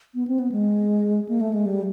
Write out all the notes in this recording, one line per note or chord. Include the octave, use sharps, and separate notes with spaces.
B3
C4
B3
G#3
A#3
A3
G#3
G3